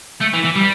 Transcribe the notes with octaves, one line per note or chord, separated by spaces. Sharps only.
A3
E3
E3
G3